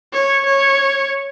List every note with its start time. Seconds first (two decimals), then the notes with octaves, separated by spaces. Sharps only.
0.13 C#5
0.46 C#5